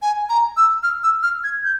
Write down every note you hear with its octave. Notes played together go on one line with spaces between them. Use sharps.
G#5
A#5
E6
F6
E6
F6
G#6
G6